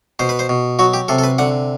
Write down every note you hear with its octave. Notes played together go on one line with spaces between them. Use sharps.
B2 C5
B4
C5
B2
F#3 F#4
G4
C3 A4
A4
B4
D3 F#5